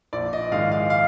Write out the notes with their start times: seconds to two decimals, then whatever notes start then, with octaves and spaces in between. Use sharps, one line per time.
0.13 A#1 D5
0.33 D#5
0.51 G#2 D#3 G#3 F5
0.72 F5
0.90 F5